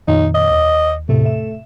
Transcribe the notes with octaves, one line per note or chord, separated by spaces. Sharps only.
F2 A#2 D#3 D#4
D#5
D#2
E2 A2 C3 A3
E5 E7